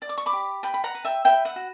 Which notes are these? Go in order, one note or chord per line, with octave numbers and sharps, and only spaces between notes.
D5
D6
C#6
B5 D6
G4
B4 G5 B5
B5
F#5 A#5
B4
E5 G5
B4 E5 G5
F#5
F#4